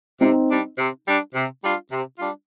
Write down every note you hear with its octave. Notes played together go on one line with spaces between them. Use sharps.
C3 C4 D#4
G3 D4
C3
G3 D4
C3
G3 D4 F4
C3
G3 D4 F4